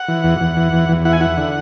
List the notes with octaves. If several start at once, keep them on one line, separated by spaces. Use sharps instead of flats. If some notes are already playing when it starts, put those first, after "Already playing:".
Already playing: F#5
E3
E2
E2
E3
E2
E2
E4 F#5
G#5
E4 F#5
D3